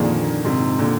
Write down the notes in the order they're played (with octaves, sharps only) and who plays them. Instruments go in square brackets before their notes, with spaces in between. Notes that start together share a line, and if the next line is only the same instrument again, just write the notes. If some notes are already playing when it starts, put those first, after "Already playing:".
Already playing: [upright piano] F2 D#3 A#3 D4 G#4 [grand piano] A#2 D3
[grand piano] G#2 C3
A#2 D3